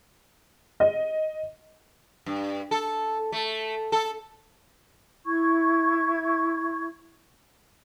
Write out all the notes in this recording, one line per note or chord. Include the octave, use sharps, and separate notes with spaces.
D#5
G2
A4
A3
A4
E4 C#6 G#6